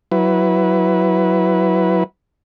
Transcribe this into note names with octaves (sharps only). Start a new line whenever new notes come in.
F#3 E4 B4